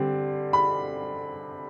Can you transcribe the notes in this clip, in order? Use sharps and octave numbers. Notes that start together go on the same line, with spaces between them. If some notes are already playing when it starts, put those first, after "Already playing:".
Already playing: D3 G3 C4
B5